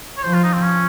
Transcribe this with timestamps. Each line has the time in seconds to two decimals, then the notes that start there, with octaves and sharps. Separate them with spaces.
0.17 C#5
0.23 F3 C5
0.33 F4
0.43 D#4
0.53 C4
0.62 C#4